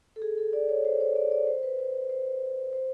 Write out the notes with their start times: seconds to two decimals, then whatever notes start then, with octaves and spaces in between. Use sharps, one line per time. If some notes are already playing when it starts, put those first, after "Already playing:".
0.16 A4
0.22 G#4
0.38 A4
0.53 D5
0.69 C#5
0.85 C5
1.00 C#5
1.16 D5
1.32 D5
1.47 C5
1.63 B4
1.79 C5
2.09 C5
2.73 C5